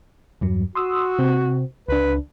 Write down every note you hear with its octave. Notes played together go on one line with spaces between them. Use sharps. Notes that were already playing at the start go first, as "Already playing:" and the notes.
E2 G2 F#3
F#4 C6 D#6 E6
C3 C4
C#2 D4 B4